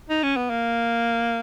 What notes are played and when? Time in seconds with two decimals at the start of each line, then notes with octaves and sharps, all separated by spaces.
0.10 D#4
0.23 C#4
0.36 B3
0.50 A#3